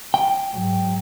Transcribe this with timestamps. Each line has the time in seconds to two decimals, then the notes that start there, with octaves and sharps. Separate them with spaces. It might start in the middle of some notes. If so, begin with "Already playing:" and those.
0.14 G5
0.51 G#2 F#3